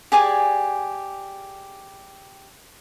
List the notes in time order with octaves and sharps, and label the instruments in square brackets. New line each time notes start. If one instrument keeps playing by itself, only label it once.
[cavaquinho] G4 G#4 D5 G#5